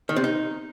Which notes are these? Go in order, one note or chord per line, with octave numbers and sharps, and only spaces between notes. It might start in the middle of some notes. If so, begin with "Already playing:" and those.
D#3
C3
D#4